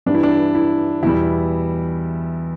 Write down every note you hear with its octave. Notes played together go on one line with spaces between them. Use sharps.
G2 E3 G3 D4
E4
D4
E4
E2 B2 G3 E4